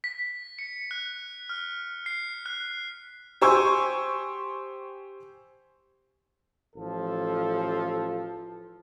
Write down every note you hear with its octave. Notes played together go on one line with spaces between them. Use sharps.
B6
C#7
F#6
F6
C7
F#6
G4 C5 G#5 C#6 E6
A1 F3 A4